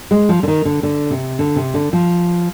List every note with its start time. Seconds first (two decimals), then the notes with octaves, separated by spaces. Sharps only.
0.11 G#3
0.29 F3
0.43 D3
0.48 D#3
0.65 D3
0.83 D3
1.11 C3
1.39 D3
1.56 C3
1.74 D3
1.93 F3